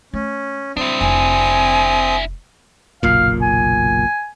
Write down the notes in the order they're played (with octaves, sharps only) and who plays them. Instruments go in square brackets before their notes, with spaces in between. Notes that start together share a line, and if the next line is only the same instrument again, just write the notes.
[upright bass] A3 [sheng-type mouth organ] C#4
[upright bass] G3 [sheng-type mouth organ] C4 D#6 [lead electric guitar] D4 E4
[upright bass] F1 [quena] G#5
[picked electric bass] F#1 B1 A#2 [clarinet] F5
[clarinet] G#5